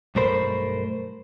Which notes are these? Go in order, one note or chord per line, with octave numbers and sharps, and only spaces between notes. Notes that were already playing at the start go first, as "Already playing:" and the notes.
B1 G2 A3 A#4 C5 B5